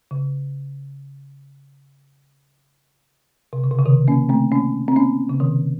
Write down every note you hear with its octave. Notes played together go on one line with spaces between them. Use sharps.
C#3
C3
C#3
C3
C#3
C3 D#3
A#3 C#4
A3 C4
A#3 C#4
C4
A#3 C#4
C#3
C3 D#3